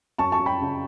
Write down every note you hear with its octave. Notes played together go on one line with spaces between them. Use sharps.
F#2 A5 C#6
A5 C#6
F#2
G5 B5
C#3